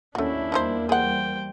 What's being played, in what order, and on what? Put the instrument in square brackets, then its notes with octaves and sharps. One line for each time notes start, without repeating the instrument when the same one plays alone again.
[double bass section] D#2 C#4 [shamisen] A3 F#4 [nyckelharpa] D4 E4
[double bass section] E2 G3 A#3 [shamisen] F3 D#4 C5
[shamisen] G#4 F#5 [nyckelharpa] C5 G5